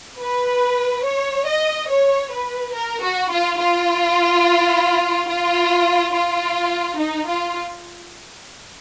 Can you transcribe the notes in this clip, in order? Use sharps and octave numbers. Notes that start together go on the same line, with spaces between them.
B4
C#5
D#5
C#5
B4
A#4
F#4
F4
F4
F4
F4
D#4
F4